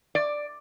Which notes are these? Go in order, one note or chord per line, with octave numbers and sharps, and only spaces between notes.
D5